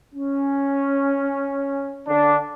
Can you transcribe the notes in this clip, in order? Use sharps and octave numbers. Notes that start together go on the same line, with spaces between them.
C#4
D3 D4